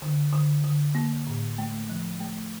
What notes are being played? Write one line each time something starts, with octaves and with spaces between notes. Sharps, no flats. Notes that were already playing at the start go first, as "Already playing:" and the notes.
D3
D3
D3
A#3
A2
A3
F3
A3